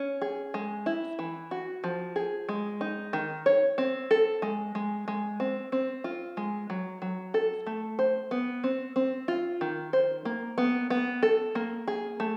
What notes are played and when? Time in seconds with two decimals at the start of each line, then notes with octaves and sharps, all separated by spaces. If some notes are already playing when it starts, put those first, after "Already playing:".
Already playing: C#4
0.22 G#4
0.54 G#3
0.86 E4
1.19 E3
1.51 F#4
1.84 F3
2.16 G#4
2.49 G#3
2.81 D#4
3.13 D#3
3.46 C#5
3.78 C4
4.11 A4
4.42 G#3
4.75 G#3
5.08 G#3
5.40 C4
5.72 C4
6.04 F4
6.37 G#3
6.70 F#3
7.02 F#3
7.34 A4
7.66 A3
7.99 C5
8.31 B3
8.64 C4
8.96 C4
9.28 F4
9.61 D#3
9.93 C5
10.25 A#3
10.58 B3
10.90 B3
11.23 A4
11.55 A#3
11.88 G#4
12.20 A3